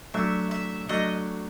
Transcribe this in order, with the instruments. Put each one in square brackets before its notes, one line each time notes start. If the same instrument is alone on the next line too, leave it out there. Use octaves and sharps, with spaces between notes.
[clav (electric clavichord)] F#3 A3 D4 F#4 [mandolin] E5
[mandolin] E5
[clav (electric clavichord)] F#3 A3 D4 F#4 [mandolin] D#5